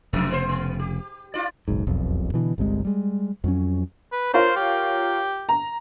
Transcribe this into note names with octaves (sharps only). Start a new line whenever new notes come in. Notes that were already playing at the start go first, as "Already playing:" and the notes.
F1 F2 C#3
B3 C5
B3
G4
E4 F4 D5
F#1 B1 G#2
E1 B1 F2
B2 D3 E3
G1 C2 C3 G#3
G3 G#3
F2 F#3 C#4
B4
F4 A#4 C5 C#5
G4
A#5